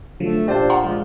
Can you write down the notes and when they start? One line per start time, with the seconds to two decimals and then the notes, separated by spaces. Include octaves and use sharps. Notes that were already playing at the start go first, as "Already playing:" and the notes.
0.20 D3 F3 F#3 A3
0.48 A#2 D4 G4 C5 D5 A5
0.70 F#5 A#5 C6
0.84 F3 G#3